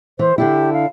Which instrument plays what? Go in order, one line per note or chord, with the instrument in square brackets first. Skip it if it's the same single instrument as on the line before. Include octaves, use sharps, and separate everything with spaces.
[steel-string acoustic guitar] E3 [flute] C5
[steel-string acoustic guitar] D3 D4 E4 [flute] G4
[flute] F5